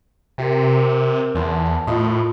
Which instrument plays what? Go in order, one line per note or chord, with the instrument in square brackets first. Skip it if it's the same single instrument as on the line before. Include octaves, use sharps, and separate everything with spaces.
[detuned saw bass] C3 [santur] F#4 A#4
[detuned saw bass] E2 [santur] C5 A5 C6
[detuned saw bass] A2 [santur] D#4 F4 D#5